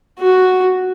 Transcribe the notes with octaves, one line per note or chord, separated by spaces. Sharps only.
F#4